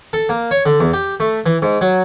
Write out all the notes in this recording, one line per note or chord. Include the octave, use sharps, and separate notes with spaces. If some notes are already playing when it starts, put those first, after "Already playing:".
A4
A#3
C#5
D3
E2
G4
A3
E3
G#2
F#3